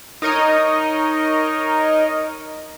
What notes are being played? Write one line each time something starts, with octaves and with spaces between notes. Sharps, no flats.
D#4 A#4 C#5 D#5